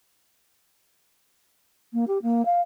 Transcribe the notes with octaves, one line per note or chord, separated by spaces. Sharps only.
A#3
G4
A#3
F5